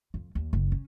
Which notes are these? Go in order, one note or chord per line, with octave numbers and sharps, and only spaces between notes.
F2
D#2
F#1
C#4